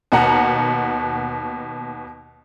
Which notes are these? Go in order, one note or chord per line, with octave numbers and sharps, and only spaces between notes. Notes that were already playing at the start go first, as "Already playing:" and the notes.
D#2 B2 F#5 A#5